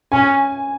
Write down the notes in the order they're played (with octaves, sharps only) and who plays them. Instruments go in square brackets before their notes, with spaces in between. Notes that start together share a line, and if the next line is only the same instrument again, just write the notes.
[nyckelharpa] C#4 [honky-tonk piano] G#5